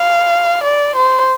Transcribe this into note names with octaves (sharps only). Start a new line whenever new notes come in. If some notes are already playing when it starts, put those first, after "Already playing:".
Already playing: F5
D5
C5